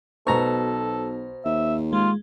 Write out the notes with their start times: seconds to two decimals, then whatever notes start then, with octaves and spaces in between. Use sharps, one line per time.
0.27 B1 B2 A4 C5 A#5 C#6
1.45 D#2 E5
1.93 G#3 F4